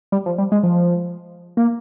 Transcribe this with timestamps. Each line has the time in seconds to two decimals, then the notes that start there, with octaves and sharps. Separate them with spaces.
0.12 G3
0.26 F3
0.38 G3
0.52 G#3
0.63 F3
1.57 A#3